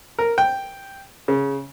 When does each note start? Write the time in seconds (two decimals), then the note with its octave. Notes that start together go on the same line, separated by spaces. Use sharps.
0.19 A#4
0.38 G5
1.28 C#3